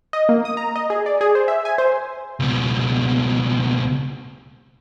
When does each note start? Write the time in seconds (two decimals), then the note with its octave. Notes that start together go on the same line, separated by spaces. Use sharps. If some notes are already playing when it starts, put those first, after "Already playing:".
0.13 D#5
0.29 A#3
0.45 D#6
0.57 A#5
0.76 D#5
0.90 G#4
1.06 D5
1.21 G#4
1.35 C5
1.48 E5
1.65 G#5
1.78 C5
2.40 C#2 B2